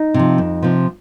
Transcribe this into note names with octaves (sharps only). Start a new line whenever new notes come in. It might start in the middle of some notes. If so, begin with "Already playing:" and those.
Already playing: D#4
C3
F3
F2
C3 F3